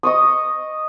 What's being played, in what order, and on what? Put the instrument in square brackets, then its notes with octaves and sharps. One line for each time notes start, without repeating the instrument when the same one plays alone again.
[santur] D#5 C#6 D#6